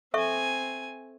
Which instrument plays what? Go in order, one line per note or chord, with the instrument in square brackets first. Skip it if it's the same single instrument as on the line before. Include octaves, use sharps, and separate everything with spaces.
[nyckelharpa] C4 G#5 [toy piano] A4 E5 C#6